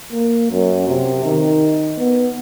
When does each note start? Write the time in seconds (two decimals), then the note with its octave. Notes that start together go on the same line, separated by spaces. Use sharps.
0.12 A#3
0.52 F#2
0.89 C3
1.25 D#3
1.98 B3